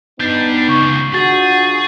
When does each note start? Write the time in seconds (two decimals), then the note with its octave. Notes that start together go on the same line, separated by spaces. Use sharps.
0.20 B3 D4 D#4 G4 G6 C7
0.69 C#2 C#6
1.14 D4 F4 F#4 G#4 A6